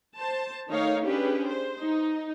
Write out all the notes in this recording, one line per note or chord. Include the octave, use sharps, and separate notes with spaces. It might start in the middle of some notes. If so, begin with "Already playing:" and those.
C5 A5
D#3 A3 D#4 C#5 F5
C#4 D4 G4 G#4 B4
C5
D#4